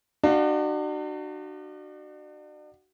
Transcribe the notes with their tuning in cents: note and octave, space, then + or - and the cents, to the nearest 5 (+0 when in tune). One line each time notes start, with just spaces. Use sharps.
D4 +40 F#4 +20 F5 +0